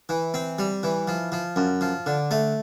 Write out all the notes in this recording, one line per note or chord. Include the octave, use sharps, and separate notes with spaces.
E3
C4
G3
E3
F3
F3
F#2
F3
D3
A3